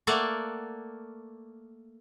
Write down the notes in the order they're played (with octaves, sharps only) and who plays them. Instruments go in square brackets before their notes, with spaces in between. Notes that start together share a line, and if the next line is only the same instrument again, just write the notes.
[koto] A3 A#3 A4 D5 F5 F#5